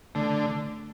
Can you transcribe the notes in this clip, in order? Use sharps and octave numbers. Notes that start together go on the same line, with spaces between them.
D3 A3